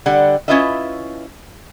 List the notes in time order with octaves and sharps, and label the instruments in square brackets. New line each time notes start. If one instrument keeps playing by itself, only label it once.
[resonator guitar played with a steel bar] D3 G3 F#5
C#4 E4 F4 B4 D#5 E5